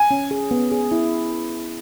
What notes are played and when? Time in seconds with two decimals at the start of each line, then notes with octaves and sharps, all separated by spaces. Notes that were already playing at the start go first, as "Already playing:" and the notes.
Already playing: G#5
0.11 C#4
0.31 G#4
0.51 B3
0.72 G#4
0.91 E4